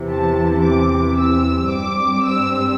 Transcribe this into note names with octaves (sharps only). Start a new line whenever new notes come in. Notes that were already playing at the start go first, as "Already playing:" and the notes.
Already playing: E2 C3 E3
A5
D6
E6
G2 G3 C4 D6
E6